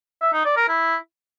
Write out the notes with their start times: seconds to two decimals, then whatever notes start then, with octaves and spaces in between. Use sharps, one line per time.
0.22 E5
0.33 D#4
0.45 D5
0.57 A#4
0.68 E4